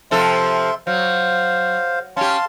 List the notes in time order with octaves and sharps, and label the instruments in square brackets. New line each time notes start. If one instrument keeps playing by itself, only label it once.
[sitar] C3 F3 A4 [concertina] E5 C6
[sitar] F#3 [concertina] C5 F5
[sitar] C#4 G4 [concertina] F5 A5 C6